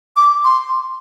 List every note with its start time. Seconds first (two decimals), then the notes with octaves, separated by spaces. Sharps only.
0.16 D6
0.44 C6